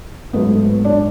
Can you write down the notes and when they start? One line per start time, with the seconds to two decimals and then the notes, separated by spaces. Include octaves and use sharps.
0.33 G#2 F#3 A3 B3 B4
0.85 D4 D5